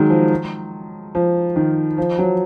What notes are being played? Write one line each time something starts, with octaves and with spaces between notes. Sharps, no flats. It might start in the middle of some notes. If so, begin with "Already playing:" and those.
Already playing: D#3 F#3 G#3
F3
F3
D#3
F3
F#3